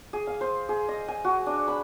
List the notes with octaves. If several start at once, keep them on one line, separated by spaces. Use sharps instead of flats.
G#4
F5
C5
G#4
D#5
G#5
F#4
D4
B5